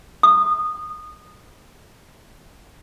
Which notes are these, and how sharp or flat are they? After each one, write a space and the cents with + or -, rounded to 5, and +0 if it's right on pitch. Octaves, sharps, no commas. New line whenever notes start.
D#6 -20